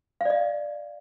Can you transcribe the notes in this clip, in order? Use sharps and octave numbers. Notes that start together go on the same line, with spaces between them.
D5 D#5 F5